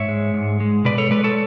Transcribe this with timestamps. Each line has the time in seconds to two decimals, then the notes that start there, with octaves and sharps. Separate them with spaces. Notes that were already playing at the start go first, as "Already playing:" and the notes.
Already playing: G#2 C#5 E5
0.09 G#3
0.34 G#2
0.60 G#3
0.85 B2 B4 D5
0.98 A4 C#5
1.11 G#3 B4 D5
1.24 A4 C#5